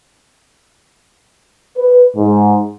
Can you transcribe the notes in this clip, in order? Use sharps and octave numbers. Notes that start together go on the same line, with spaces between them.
B4
G#2